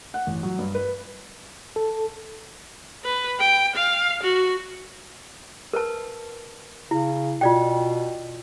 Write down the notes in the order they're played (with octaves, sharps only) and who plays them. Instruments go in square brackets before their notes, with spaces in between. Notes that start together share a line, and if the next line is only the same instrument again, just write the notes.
[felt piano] F#5
A1
F#3
G2
B4
[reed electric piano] A4
[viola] B4
G5
F5
F#4
[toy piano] A#4 B4 A5
[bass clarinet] C#3 [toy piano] E4
[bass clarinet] B2 [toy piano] F4 D5 G5